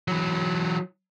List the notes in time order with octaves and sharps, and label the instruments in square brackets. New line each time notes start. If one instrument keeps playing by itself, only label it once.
[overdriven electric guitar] E3 F#3